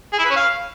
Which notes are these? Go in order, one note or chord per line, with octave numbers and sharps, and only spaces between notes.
G#4
E4
B4
C#4
F5